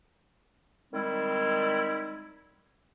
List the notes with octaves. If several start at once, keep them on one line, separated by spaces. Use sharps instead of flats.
D#3 G3 G#3 C4 D#4 E4